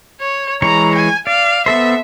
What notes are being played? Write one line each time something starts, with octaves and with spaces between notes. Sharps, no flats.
C#5
E3 G#3 C#5 A#5
G#5
D5 F5
B3 A4 C5 E5